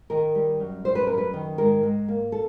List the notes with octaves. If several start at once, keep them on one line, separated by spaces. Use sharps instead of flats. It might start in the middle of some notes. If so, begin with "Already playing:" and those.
D#3 A#4
G3
F#2
G3 C5
B4
F#2 A#4
B4
D#3
G#2 A#4
G#2
A#3
A4